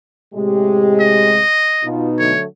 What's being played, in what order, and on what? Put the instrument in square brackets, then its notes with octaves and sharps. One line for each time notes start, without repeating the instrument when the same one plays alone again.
[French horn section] A2 C3 G#3 [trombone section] G4
[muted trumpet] D#5
[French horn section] B2 D#4 [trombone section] F4
[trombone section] D3 F#3 A3 [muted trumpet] C#5